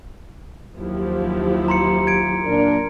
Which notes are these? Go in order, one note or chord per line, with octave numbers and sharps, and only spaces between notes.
D#2 F3 F#3 E4 G4
A#5 C6 C#7
G#6 D7
A#2 D4 A#4